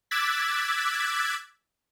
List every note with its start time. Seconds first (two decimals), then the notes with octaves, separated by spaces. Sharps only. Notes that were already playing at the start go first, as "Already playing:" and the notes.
0.11 D6 E6 F#6 G#6 A6 B6